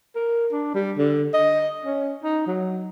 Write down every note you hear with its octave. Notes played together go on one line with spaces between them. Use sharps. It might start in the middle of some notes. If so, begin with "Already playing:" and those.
A#4
D4
G3
D3
D#5
C#4
D#4
F#3